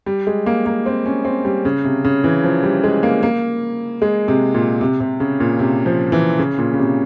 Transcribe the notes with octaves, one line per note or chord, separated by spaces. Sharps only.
G3
G#3
A#3
A#3
C4
C#4
C4
G3
C#3
C3
C#3
E3
F3
G3
G#3
A#3
A#3
G#3
C3
A#2
C3
C3
C#3
A#2
C3
F3
E3
C#3
A#2
C#3
C3